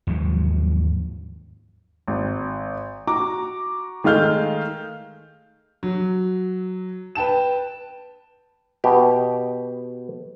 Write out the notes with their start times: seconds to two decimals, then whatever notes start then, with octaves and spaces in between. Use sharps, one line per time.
0.07 D#2 G#2 F3 F#3
2.08 G#1
3.07 F#4 A#5 D6
4.04 D#3 G#3 A3 F5 F6 G6
5.83 F#3
7.15 B4 G5 A5 E7
8.84 B2 G4